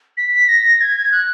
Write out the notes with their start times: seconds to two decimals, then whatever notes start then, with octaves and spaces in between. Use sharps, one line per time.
0.17 B6
0.48 A#6
0.81 G#6
1.12 F#6